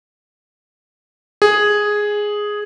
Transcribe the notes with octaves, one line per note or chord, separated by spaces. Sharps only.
G#4